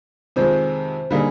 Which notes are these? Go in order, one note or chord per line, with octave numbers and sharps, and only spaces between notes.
F2 C3 D#3 G#3 C5
D3 G3 A#3 D#4 G#4